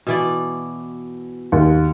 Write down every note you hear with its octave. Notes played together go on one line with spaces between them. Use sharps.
B2 E3 D5
D#2